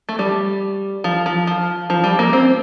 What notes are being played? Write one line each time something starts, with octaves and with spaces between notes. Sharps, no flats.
A3
G3
F3
F3
F3
F3
G3
A#3
C4